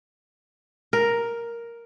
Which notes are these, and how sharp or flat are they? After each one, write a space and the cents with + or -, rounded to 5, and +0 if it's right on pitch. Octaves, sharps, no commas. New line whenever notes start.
A#4 +5